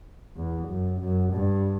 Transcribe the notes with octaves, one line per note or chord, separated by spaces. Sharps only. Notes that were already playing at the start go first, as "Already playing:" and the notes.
E2
F#2
F#2
G2